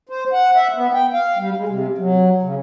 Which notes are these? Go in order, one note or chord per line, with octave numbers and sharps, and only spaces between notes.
C5
F#5
E5
B3
G5
F5
G3
G#3
C3
F#3
C#3